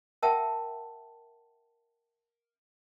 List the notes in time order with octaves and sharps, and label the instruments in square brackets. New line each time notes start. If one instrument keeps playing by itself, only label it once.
[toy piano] A#4 E5 F#5 G5 A5